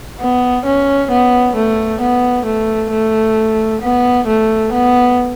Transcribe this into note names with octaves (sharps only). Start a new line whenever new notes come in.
B3
C#4
B3
A3
B3
A3
A3
B3
A3
B3